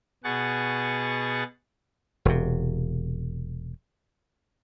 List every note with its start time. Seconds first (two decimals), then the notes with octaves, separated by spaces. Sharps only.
0.24 B2 G#4 F#5 C#6 A6
2.25 E1 C3